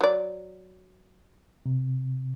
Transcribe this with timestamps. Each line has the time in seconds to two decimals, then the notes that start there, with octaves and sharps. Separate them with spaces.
0.01 F#3 D5
1.66 C3